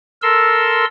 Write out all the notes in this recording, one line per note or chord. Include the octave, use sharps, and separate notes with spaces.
A4 A#4 C6 E6